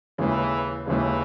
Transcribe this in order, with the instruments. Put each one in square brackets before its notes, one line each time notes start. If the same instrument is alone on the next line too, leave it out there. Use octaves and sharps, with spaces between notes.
[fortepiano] D#2 C#3 G#3 [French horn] E3
[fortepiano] D#2 C#3 G#3 [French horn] E3